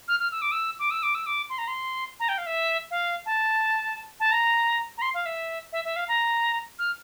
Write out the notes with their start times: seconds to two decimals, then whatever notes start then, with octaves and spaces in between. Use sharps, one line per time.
0.08 F6
0.20 F6
0.32 E6
0.42 D6
0.52 E6
0.79 D6
0.91 E6
1.03 D6
1.15 E6
1.26 D6
1.50 C6
1.58 A#5
1.68 C6
2.20 A#5
2.29 G5
2.38 F5
2.46 E5
2.91 F5
3.26 A5
4.20 A5
4.32 A#5
4.98 A#5
5.02 C6
5.14 F5
5.26 E5
5.73 E5
5.85 E5
5.96 F5
6.08 A#5
6.79 F6